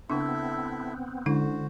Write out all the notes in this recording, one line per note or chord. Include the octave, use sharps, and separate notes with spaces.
C#3 B3 C4 D4 E4 A4 E5
D3 G#3 C#4 E4 F#4 C5